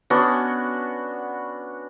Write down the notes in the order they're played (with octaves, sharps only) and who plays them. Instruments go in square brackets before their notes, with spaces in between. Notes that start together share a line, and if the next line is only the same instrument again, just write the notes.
[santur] B3 C#4 D4 F#4